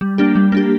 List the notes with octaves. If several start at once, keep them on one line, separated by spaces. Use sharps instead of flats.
G3
A#3 D4 G4
G3
A#3 D4 G4